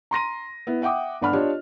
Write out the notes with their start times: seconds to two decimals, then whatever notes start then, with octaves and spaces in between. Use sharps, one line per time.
0.11 A#5 C6 A#6 D#7
0.67 B3 E4
0.82 E5 F#5 G5 D6 D#6
1.21 G1 D4 F#5 B5 F6
1.33 D4 F4 G4 C#5 D#5